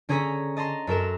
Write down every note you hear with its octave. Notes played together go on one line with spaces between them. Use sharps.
D3 C#4 G#4 A#5 B6
D#5 A5 A#5 C6
F#2 A4 A#4 E7